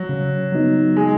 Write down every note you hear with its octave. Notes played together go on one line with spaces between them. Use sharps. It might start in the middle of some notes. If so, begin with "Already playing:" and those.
Already playing: F#3
C#3
F#3 B3 D#4
G#3